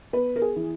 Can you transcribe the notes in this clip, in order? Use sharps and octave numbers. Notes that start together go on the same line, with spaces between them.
B3 B4
A#4
G#4
E3